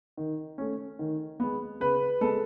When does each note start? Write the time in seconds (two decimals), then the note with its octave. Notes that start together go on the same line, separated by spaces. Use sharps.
0.17 D#3
0.58 A3 C#4
0.99 D#3
1.40 G#3 B3
1.80 C#3 B4
2.21 G#3 B3 A4